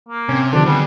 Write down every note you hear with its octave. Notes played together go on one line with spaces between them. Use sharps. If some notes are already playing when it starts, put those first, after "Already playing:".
A#3
C3 C4 C#4
D3 D#3 F3 D4 G4
F#3 G3 B3 C4 G#4